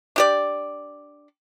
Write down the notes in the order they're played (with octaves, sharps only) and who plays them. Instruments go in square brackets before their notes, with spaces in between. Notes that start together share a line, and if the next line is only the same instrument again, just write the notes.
[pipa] D4 G4 D5